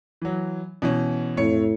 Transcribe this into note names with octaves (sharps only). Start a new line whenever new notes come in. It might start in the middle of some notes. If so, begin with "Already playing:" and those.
E3 F#3
B2 E3 C#4
F2 A2 C#5 C#7